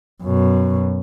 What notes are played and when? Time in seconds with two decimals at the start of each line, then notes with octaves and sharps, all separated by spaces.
0.23 F#2 B2